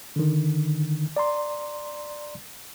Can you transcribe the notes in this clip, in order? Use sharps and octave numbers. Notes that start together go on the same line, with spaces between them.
D3 D#3
D5 A#5 C6